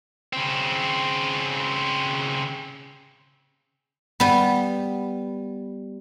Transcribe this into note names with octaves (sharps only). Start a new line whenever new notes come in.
C#3 C4
G3 B3 B5